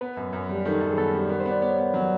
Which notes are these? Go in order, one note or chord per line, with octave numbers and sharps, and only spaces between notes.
B3 B4
F#2
F#2
G3
D#3 A4
F#2 A4
G#4
B3 A4
G3
B3 A#4
C5
B3
D5
B3 C#5
B3
F#3